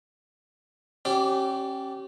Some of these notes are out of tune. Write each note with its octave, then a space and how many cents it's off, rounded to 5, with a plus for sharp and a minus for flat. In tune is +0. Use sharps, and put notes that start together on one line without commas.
C#4 -30 G4 -30 D5 +0